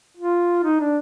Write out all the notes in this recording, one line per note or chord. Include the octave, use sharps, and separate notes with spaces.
F4
D#4
D4